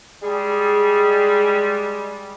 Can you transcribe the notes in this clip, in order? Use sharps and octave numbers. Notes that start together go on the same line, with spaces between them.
G3 G#3 G#4